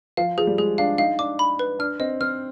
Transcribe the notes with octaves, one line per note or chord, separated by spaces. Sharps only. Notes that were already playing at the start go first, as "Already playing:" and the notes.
F3 F5
F3 G#4
G3
G#3 G#4
D4 F5
D#4 F5
D4 D6
B5
B4
D4 F6
C4 D#5
C4 F6